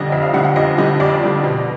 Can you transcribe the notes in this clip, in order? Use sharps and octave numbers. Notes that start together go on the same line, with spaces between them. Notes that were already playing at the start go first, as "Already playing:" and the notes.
Already playing: F2 D3 G3 D5 D#5
F2 E5
F5
D3 G3 F#5
F#5
F2 D#5
D3 G3 D#5
F2 D5
D3 G3
B2